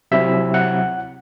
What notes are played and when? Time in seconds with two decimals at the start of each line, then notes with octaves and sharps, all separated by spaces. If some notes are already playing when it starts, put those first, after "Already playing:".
0.12 C3 F#3 C4 E4 E5
0.54 F#5